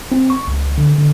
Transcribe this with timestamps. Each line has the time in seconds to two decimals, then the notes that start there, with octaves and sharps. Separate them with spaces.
0.12 C4
0.30 C#6
0.47 C#2
0.78 D3
0.98 D3